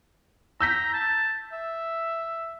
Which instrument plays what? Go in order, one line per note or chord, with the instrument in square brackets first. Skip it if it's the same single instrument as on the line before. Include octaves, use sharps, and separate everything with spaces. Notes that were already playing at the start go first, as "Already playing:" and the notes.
[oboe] A#5 [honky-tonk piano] E6 G6 B6
[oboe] A5
E5